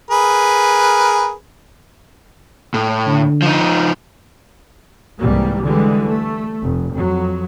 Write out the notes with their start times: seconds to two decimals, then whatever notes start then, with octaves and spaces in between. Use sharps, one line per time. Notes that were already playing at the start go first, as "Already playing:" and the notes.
0.11 G#4 A#4 B4
2.74 A2
3.07 D3
3.42 F3 D#4
5.19 C2 G#2 E3 G3 A#3
5.63 D3 E3 G3 G#3
6.06 A3
6.61 F1
6.94 F2 F#3